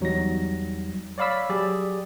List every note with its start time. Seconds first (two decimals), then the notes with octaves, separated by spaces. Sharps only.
0.01 E2 F#3 G3 D#4 A#6
1.18 C#5 D5 F5 B5 E6 B6
1.49 F#3 G4 G#4 D5